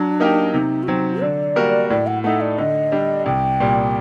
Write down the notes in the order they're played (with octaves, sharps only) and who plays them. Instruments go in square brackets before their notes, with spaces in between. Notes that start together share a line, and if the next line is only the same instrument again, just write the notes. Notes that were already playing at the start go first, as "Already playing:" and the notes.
Already playing: [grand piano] F#3 [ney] D4
[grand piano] A#3 D#4 G4 A#4
[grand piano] C3 [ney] D#4
[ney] F#4
[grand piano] F#3 C4 [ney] D#4
[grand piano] D3 [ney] D5
[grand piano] G3 A#3 F#4 A#4
[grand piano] A2 [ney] D5
[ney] F#5
[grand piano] A3 D#4 A4 [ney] F#5
[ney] D5
[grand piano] D3 [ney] D#5
[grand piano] G3 D4
[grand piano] C2 [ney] G5
[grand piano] A#2 G3